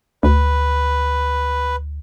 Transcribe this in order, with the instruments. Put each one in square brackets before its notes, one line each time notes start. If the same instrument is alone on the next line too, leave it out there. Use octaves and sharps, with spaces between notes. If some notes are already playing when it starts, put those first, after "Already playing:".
[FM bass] D2 [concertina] B4